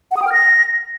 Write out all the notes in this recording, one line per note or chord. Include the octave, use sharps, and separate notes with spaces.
F#5
D#6
G5
F6
A#6